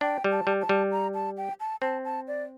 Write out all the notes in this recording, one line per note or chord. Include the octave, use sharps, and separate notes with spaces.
D4 G5
G3
A5
G3
A5
G3
A#5
A5
G5
A5
C4 A5
A5
D5